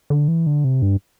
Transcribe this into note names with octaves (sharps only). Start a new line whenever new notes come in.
D3
E3
D3
C3
G2